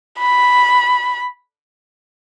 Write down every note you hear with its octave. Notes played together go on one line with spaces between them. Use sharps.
B5